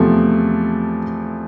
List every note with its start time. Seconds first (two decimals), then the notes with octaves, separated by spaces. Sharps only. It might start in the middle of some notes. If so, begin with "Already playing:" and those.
Already playing: E2 C3 F3 A3